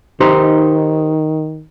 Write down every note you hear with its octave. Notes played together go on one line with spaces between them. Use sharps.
D#3 D#4 G4 C5